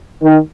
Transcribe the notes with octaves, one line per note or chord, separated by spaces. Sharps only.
D#3